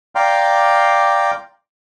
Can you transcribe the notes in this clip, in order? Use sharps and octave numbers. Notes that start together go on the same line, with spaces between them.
D5 F5 G5 A#5 C6 D6